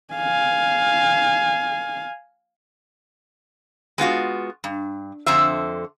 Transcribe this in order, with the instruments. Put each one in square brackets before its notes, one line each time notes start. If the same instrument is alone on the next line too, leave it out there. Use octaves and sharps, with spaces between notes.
[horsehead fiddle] F5 G#5
[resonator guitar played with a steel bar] G#3 B3 F4 F#4
G2
F2 D3 C5 E5